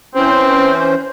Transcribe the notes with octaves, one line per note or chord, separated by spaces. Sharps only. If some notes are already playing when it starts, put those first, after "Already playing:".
E3 C4 C#4 C5